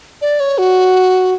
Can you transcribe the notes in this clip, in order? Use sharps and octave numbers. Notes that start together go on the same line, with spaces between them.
D5
C#5
F#4